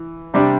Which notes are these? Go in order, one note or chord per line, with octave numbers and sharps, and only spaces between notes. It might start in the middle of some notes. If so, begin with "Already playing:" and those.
Already playing: E3
C3 G3 D4 G4